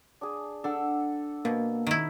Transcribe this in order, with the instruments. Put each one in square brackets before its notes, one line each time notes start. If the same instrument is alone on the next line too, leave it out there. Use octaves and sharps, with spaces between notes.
[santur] D4 G#4
[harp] D4 [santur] A4 F#5 E6
[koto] B2 [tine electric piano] A#3
[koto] D#3 E4